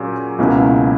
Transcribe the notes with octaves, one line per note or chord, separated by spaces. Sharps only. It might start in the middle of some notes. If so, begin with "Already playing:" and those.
Already playing: A#2 F#3 C#4 G#4
C#2 B2 A#3 C#4 E4